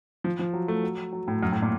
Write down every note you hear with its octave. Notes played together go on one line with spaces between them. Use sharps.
F3
F3
F#3
A3
F#3
F#3
A2
F#2
A2
A#2